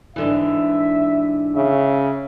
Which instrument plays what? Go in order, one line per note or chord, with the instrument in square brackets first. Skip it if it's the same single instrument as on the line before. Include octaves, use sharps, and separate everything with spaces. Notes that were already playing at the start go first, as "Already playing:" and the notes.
[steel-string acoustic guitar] G#2 D3 E3 [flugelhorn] E5
[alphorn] C#3 [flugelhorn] E5